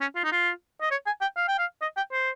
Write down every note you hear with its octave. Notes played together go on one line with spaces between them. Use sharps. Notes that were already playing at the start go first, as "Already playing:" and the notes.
C#4
F4
D#4
F4
D#5
C#5
G#5
G5
F5
G5
F5
D#5
G5
C5